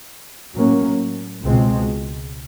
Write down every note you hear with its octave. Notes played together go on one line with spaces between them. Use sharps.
A2 F#3 A#3 C#4
C#2 B2 G#3 C4